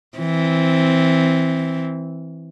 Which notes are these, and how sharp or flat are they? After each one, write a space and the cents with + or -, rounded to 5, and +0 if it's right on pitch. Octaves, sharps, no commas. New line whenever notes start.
E3 -5 C4 +0